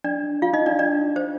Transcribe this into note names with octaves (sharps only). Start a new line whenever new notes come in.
D4 D5
F4 F5
D#4 D#5
D4 D5
D4 D5
C5